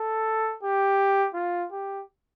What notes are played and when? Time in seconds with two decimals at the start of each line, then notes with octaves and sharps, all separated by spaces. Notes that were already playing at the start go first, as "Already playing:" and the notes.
Already playing: A4
0.63 G4
1.34 F4
1.71 G4